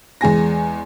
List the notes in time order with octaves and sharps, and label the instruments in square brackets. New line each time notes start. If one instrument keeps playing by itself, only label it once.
[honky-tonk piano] E2 G#3 G#5 A#6